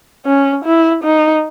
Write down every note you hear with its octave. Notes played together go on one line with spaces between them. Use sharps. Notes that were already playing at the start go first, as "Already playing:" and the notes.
C#4
E4
D#4